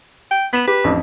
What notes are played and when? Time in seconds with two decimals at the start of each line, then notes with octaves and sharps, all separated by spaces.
0.31 G5
0.53 B3 B6 E7
0.67 G4 B4
0.84 A1 F2 D4